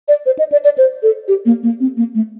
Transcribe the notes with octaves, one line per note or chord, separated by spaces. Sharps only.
D5
C5
D#5
D5
D5
C5
A4
G4
A#3
A#3
C4
A#3
A3